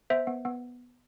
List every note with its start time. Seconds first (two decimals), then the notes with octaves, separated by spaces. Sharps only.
0.10 B3 C5 E5
0.27 B3
0.45 B3